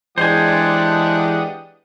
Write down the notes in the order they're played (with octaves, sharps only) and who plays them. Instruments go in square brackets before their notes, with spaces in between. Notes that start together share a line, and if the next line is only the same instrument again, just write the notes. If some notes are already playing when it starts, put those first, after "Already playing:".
[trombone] E3 [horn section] G#3 D4 [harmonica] G4 D#5 F#5 [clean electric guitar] C5 G#5